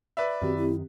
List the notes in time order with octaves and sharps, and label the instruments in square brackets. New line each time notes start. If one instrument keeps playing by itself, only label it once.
[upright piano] B4 D5 E5
[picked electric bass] F#2 D#3 [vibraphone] C4 G4 [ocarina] F#4
[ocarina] E4